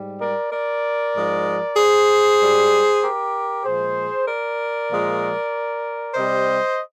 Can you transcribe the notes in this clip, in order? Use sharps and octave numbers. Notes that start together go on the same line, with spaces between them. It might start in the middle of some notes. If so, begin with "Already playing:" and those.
Already playing: G#2 G3
A#4 D5
A#4 D5
G#2 F3 G#3
G#4 C5
G#2 G3
G4 A#4
A#2 F3 G#3 G#4 C5
A#4 D5
A#2 F3 G#3
C3 G3 C5 D#5